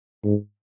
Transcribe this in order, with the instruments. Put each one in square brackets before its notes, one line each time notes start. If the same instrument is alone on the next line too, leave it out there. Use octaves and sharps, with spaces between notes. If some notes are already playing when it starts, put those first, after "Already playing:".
[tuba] G#2